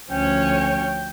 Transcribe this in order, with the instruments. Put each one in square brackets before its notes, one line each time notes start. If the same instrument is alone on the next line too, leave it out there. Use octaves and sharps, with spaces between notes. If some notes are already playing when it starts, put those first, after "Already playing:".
[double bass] D2 F3 [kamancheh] C#4 C#5 [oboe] G5